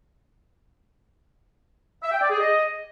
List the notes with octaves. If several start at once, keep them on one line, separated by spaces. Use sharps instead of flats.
E5
G5
D5
G#4
D#5